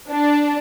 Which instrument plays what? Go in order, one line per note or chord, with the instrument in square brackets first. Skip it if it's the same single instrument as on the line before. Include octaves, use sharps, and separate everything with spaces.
[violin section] D4